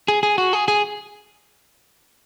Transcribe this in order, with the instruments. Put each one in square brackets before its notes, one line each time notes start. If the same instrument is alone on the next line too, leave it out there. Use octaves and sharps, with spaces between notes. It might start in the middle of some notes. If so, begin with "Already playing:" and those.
[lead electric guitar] G#4
G#4
F#4
G#4
G#4